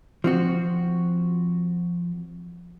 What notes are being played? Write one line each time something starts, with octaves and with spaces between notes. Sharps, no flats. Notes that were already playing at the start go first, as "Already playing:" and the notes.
F3 C4 F#4